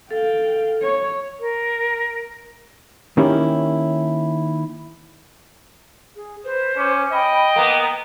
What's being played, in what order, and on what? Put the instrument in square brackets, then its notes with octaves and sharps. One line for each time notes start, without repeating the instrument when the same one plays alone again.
[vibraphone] A4 [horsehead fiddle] F5 G5
[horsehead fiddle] C#5
[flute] A#4
[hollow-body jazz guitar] D#3 A#3 C#4 E4 G4
[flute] G#4
[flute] B4 [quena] C5
[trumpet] C#4 [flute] D6
[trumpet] D#5 [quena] G5 [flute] B5
[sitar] A#3 B3 [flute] A#5